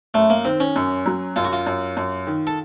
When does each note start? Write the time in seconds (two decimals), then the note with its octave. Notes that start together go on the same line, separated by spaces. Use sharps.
0.14 F#2 A3
0.30 A#3
0.45 D#3 C4
0.60 C#4
0.76 F#2
1.06 F#3
1.36 F#2 F4
1.45 F#4
1.53 F4
1.67 F#2
1.97 F#2
2.27 D#3
2.47 A4